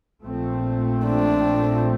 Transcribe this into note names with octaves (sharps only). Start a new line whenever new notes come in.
A#1 A#2 F3 A3 C4
D4